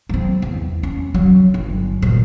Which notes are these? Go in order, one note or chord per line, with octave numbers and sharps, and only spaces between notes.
F#3 C4
E2
C#4
F#3
G1
A#2 F#3